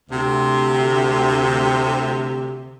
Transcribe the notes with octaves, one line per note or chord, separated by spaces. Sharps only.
D2 C3